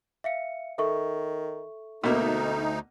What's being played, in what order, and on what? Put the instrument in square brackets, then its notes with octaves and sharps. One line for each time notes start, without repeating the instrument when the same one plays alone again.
[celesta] E5 F5 C#7
[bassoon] D#3 [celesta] A4 E5 C#6
[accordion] D2 D#4 [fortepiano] B2 A#3 [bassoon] A3